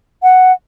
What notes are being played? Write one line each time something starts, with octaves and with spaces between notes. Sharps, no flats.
F#5